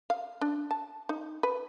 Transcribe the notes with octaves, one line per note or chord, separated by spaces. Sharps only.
F5
D4
A5
D#4
B4